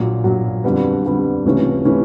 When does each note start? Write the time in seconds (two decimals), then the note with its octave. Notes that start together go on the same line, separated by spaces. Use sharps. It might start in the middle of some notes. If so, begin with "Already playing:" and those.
Already playing: A#1 A#2 F#3
0.24 A#1 A#2 F#3
0.64 F2 D3 G3 B3
1.05 F2 D3 G3 B3
1.45 C#2 C3 E3 A3 C#4
1.85 C3 E3 A3 C#4